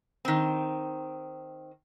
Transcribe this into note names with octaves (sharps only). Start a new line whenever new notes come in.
D#3 C4